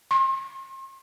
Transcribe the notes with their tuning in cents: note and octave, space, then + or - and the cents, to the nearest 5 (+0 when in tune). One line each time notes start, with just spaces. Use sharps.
C6 +40